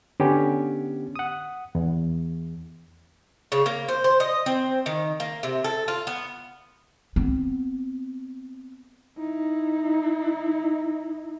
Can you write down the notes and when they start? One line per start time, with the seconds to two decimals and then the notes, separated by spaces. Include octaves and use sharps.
0.20 D3 B3 C#4 G4
1.16 F#5 D#6
1.75 E2
3.52 C#3
3.66 A#3
3.88 C5
4.04 C5
4.20 D#5
4.46 C4
4.86 D#3
5.20 A#3
5.43 C3
5.64 A4
5.88 F4
6.07 B3
7.16 B3 C4
9.18 D#4 E4